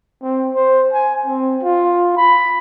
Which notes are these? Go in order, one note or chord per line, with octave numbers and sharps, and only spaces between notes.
C4
C5
G#5
C4
F4
B5